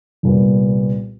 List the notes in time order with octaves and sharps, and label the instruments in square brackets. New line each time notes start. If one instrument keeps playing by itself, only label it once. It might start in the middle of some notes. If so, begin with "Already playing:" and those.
[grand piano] C2 A#2 G3 B3